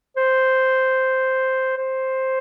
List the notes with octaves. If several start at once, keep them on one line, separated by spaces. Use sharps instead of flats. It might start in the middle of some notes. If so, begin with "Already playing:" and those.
C5
C5